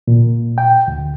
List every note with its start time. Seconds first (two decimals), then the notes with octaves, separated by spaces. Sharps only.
0.08 A#2
0.58 G5
0.88 D2